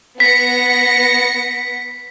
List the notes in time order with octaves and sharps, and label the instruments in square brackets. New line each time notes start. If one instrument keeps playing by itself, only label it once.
[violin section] B3 A#6 C#7 [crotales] B6